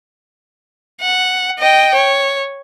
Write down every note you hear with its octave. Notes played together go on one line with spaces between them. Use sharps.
F#5
D#5 G5
C#5